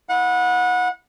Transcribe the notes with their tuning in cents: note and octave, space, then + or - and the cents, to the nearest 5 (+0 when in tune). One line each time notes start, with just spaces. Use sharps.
E4 -15 F#5 -25